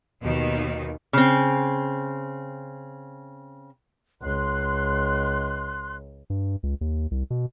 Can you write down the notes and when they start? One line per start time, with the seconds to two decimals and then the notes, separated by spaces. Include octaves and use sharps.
0.22 D#2 B2 D#3
1.13 C#3 C4
4.22 C#2 C6 F#6
6.30 G2
6.63 C#2
6.81 D#2
7.11 C2
7.30 B2